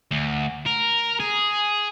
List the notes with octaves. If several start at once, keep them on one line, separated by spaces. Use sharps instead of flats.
D2
A#4
G#4